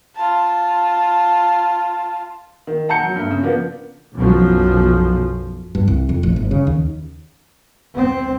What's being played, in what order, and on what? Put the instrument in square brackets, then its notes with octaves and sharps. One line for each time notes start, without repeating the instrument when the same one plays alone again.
[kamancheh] F4 A5
[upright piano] D#3
F#5 A5 A#5 G6 C#7
F#3
G2 A3
C#3
F3 A#3 B3 D4
[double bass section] B1 F#2 F3
[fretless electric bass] G2
C2
F2
A1
G1
C#3
D#2
[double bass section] C4